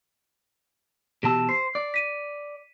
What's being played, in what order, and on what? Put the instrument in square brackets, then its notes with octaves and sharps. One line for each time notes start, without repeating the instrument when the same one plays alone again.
[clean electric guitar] B2 E3 A5 [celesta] G4 E6
[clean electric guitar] C5 [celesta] C7
[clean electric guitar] D5
[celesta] B6 D#7